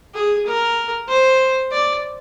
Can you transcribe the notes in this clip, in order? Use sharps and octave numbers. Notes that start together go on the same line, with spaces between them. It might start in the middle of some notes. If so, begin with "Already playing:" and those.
G#4
A#4
C5
D5